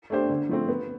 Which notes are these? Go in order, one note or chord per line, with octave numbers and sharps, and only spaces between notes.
A3 D4 G4 C5
D3
F3 A3 C4
B3